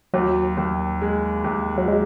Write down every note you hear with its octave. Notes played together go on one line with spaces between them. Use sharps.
D#2 F#3
D#2
G#3
D#2
F#3
G#3